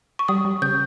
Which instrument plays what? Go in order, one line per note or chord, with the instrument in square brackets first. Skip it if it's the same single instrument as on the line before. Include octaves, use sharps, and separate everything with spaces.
[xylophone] C#6
[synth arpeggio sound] G3 [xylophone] D#6
[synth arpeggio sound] G3
[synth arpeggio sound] C#3 [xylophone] G6